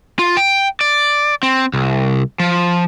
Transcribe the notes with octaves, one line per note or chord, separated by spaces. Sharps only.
F4
G5
D5
C4
C2
F3